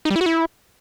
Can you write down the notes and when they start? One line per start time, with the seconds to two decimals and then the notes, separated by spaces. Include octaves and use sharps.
0.05 D#4
0.10 G3
0.16 E4
0.21 F#4
0.26 E4